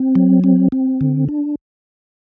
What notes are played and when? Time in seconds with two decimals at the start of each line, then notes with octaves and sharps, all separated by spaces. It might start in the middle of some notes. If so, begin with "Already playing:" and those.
Already playing: C4
0.15 F#3
0.44 C4
0.72 C4
1.01 D3
1.29 D4